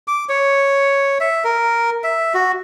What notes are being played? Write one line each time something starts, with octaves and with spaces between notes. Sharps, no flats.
D6
C#5
E5
A#4
E5
F#4